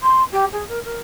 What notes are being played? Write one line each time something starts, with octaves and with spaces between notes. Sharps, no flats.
C6
G4
G#4
A#4
A#4